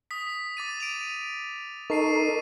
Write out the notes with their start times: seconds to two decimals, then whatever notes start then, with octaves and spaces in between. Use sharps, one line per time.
0.11 D#6 B6
0.57 D6 A6 D#7
0.80 D7 D#7 F7
1.90 D#4 A4 A#4 C#6 C7 D#7